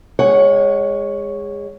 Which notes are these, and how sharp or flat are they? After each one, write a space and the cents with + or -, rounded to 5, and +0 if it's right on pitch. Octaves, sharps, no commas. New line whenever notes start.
G#3 -25 C#5 +0 F#5 +15